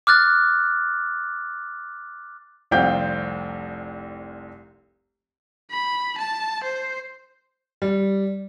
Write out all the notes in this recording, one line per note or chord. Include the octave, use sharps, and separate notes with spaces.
D6 F6 F#6 A6
F1 C2 C4 F5 G5 G6
B5
A5
C5
G3